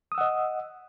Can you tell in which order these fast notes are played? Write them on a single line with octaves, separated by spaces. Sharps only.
D#6 E6 F#5 D#5